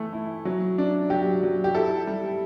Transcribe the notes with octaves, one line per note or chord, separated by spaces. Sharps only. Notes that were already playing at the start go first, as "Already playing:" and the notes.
Already playing: E3 A3
E4
F#3
D4
F#3 G4
F#3
G4
E4 A4
G3